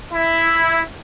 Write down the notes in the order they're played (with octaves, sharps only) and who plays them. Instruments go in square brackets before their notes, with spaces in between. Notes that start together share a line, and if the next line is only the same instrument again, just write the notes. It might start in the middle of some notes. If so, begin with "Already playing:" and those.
[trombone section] E4